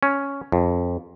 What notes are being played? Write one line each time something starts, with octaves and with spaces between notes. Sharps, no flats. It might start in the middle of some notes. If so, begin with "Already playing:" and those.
C#4
F2